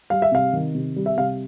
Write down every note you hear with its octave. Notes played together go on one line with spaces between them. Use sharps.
G3 F5
E5
C3 F5
D#3
C3
G3
E5
C3 F5